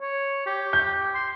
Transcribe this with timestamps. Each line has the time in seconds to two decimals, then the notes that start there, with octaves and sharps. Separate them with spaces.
0.01 C#5
0.46 G4
0.73 G6
1.15 C6